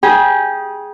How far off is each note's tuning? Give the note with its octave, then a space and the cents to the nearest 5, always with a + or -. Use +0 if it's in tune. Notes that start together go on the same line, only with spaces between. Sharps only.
G#4 +0 G5 +0 B5 -40